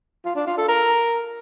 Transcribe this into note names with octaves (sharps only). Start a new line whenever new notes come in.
F4
D4
F4
A4
A#4